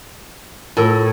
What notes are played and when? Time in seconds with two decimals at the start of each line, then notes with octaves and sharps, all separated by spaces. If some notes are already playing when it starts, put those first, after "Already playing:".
0.77 A2 F4 A#4 E6